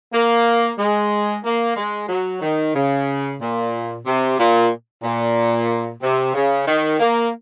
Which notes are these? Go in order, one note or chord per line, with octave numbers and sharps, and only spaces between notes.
A#3
G#3
A#3
G#3
F#3
D#3
C#3
A#2
C3
A#2
A#2
C3
C#3
D#3
A#3